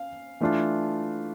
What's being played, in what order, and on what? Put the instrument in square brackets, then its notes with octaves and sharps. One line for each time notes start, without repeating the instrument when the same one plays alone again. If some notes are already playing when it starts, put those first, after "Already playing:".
Already playing: [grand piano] C#4 F5
E3 A3 D4 F4